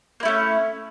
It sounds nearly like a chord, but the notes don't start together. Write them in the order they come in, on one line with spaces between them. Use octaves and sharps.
A#3 E4 A3 C#4